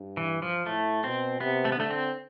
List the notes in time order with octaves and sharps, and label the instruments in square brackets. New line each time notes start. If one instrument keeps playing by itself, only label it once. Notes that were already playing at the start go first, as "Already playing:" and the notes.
Already playing: [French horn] G2
[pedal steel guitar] E3
F3
[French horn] A2 [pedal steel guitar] A3
[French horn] B2 [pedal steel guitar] C4
[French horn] C3 [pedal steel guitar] B3
[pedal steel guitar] A3
B3
[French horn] D3 [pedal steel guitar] A3
[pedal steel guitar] C4